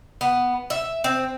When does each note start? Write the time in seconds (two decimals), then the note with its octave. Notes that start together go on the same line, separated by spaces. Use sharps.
0.21 B3
0.70 E5
1.04 C4